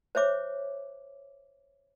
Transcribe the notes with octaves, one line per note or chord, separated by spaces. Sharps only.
C5 C#5 E5 D6